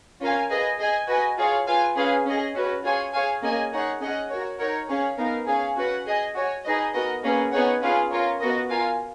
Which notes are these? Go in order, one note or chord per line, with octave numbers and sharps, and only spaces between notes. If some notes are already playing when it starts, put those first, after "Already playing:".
C#4 F4 A#4 F5 G#5
G#4 B4 D#5 G#5
G#4 D#5 G#5
F#4 B4 D#5 G#5
F4 G#4 C#5 F5
F4 B4 F5 G#5
C#4 G#4 B4 F5 G#5
C#4 G#4 D#5
C#4 F#4 B4
F4 G#4 C#5 G#5
G#4 C#5 F5 G#5
A#3 C#4 G#4 D#5 G#5
D#4 G#4 C#5 F#5
C#4 G#4 D#5 F#5
F#4 A#4 C#5
D#4 A#4 C#5 F#5
C#4 G#4 C#5 F5
B3 D#4 A#4 F5
C#4 G#4 C#5 F5 G#5
C#4 F#4 B4 F#5
G#4 D#5 G#5
F#4 C#5 G#5
D#4 G#4 B4 D#5
B3 F#4 A#4 D#5
A#3 C#4 G#4 B4
B3 D#4 G#4 C#5 F#5
C#4 F4 G#4 B4 F5
C#4 F4 A#4 C#5
B3 F#4 A#4 D#5
F4 A#4 F5 G#5